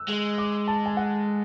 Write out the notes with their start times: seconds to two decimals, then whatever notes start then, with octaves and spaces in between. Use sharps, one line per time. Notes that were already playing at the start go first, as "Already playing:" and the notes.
Already playing: E6 F#6
0.09 G#3
0.38 D6
0.68 A5
0.86 G#5
0.97 F#5